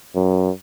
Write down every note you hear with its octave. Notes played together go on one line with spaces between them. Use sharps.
F#2